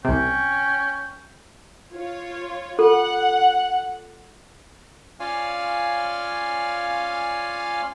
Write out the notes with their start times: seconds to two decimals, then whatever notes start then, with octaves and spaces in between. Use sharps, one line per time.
0.05 C2 C3 C#4 G5
1.93 F4 C#5
2.79 F4 A4 F#5
5.20 C#4 F4 C#5 D5 F5 G#5